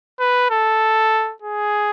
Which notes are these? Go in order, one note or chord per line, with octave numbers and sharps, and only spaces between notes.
B4
A4
G#4